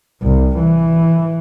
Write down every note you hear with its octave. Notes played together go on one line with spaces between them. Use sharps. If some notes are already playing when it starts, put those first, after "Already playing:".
C2
E3